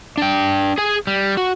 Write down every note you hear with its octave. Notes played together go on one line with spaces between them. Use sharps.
D4 G5
G#4 G#5
G3
F#4